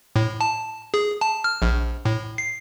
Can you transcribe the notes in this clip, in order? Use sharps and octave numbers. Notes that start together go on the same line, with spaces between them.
A2
A5
G#4
A5
F6
A#1
A2
C7